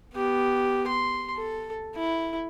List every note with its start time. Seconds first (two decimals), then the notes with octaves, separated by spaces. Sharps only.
0.14 B3 G4
0.88 C6
1.36 A4
1.96 E4